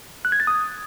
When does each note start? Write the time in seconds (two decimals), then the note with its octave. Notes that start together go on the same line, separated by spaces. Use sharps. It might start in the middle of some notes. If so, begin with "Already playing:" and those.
0.25 F#6
0.32 G#6
0.40 A6
0.47 D#6